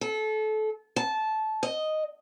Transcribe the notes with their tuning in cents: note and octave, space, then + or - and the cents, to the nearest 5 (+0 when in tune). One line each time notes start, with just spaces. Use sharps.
A4 -25
A5 -15
D#5 +0